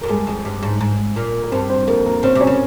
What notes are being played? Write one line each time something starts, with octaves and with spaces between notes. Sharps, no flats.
F2 A#4
G2 G#3 G#4
F2
G2
G#2
G#2
A#2
A#4
G2 C4 C5
C4 C5
F2 A#3 A#4
A#3 A#4
C#3 C4 C5
C3
C#4 C#5
C#3